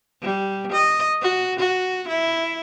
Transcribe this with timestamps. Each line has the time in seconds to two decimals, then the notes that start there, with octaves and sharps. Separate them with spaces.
0.22 G3
0.72 D#5
1.22 F#4
1.59 F#4
2.08 E4